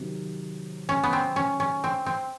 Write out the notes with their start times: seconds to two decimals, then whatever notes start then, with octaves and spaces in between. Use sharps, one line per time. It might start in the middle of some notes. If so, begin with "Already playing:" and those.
Already playing: C3 D#3 F#3
0.89 C#4
1.03 B3
1.13 C4
1.36 C#4
1.60 C#4
1.84 C4
2.06 C4